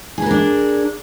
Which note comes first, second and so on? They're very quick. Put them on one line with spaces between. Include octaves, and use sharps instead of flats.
G#4 B4 A#4 D4